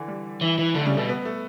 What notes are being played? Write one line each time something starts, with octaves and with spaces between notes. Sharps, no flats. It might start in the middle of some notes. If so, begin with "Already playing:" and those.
Already playing: D3 E3
G3
E3
E3
D3 A3
C#3 G3
B2 A3
B3
A3